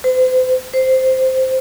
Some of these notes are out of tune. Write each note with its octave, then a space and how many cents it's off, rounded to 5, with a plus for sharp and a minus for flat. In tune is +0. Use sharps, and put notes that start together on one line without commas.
C5 -40
C5 -5